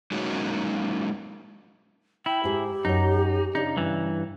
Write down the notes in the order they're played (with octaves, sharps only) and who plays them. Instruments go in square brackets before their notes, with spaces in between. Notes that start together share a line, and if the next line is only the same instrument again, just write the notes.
[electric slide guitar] F#3 G#3 A#3 C#4 D#4 F#4
[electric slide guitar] E4 [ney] G5
[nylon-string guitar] G#2 G#4 [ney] G4
[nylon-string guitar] F#2 C#5 [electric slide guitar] D#4
[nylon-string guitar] C#3 D4 [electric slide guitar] D#4
[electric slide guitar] G2 E3